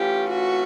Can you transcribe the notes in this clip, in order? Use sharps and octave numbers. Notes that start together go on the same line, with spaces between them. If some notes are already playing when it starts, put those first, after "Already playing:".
Already playing: E3 A3 C#4 F4 G4
F#4